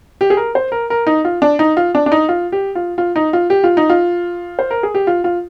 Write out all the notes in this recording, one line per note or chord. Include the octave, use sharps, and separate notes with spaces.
G4
G#4
A#4
C5
A#4
A#4
D#4
F4
D4
D#4
F4
D4
D4
D#4
F4
G4
F4
F4
D#4
F4
G4
F4
D#4
F4
C5
A#4
G#4
G4
F4
F4